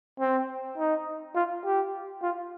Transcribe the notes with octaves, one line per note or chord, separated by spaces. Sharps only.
C4
D#4
F4
G4
F4